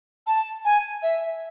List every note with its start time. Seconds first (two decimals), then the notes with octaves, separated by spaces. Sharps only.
0.27 A5
0.65 G#5
1.03 E5